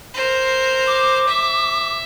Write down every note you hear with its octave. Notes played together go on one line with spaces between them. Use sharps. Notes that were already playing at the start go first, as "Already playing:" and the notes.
A#4 C5
D6
E5